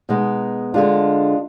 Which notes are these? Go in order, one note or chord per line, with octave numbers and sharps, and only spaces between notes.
B2 G#3 B3 D#4
D3 G#3 D4 F4